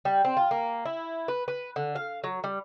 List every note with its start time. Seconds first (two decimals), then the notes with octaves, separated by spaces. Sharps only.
0.05 G3
0.25 C4
0.37 F4
0.51 A#3
0.85 E4
1.28 B4
1.48 B4
1.76 D3
1.96 F5
2.24 F#3
2.44 G3